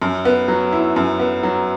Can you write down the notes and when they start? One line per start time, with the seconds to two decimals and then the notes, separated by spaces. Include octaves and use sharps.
0.02 F#2
0.25 B3
0.48 F#3
0.73 E4
0.96 F#2
1.20 B3
1.43 F#3